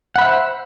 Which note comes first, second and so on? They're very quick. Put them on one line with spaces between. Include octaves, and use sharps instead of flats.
F#5 B5 E5 C5